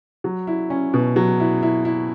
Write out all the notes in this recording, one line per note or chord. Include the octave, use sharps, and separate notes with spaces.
F#3
E4
C#4
B2
F#3
E4
E4
E4